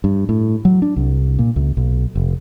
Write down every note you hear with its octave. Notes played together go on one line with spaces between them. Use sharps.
G2
A2
F#3
D4
C2
A#2
C#2
B1
F1